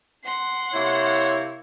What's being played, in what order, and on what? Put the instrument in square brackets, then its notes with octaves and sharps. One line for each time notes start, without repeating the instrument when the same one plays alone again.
[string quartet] F#5 C6
[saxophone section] C3 A#3 E4 [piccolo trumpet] C#5